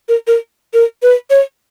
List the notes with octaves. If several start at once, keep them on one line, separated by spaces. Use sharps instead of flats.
A#4
A#4
A#4
B4
C#5